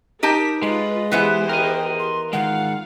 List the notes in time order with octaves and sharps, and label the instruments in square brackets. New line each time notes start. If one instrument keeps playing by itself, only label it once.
[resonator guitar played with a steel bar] D#4 G4 A5 [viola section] A#4 [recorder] B6
[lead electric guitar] G#3 [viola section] F4 B4 [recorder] D#5
[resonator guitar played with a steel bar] E3 B3 E4 [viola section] G4 G#4 C5
[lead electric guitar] A#4 D#5 [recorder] G5
[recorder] C6
[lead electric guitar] D#3 G#3 [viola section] F4 F5 [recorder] F#5